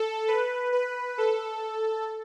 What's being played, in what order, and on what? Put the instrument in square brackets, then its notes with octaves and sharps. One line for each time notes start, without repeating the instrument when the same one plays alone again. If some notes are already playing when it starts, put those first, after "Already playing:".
Already playing: [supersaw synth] A4
B4
B4
A4